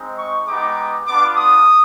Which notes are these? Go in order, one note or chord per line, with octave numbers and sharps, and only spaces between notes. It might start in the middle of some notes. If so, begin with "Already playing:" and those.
Already playing: G#3 C4 D#4
C#6
G#3 B3 D#4 G4 D6
B3 D4 F4 D6
D#6